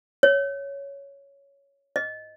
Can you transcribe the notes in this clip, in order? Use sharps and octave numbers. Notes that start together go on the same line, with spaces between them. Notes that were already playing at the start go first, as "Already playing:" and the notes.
C#5
D#5